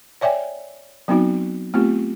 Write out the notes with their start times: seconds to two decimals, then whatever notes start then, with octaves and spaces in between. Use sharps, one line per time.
0.21 C#5 D5 E5 G5 G#5
1.08 F#3 B3 C4 D#4 F#4
1.74 A3 B3 C4 F4 G4